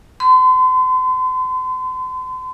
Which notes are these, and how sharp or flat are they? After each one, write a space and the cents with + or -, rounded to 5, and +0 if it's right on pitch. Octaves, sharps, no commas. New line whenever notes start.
C6 -40